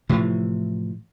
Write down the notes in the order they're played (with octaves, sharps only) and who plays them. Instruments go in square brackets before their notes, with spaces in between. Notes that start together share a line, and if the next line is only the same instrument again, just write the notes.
[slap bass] A2 C3 E3 F3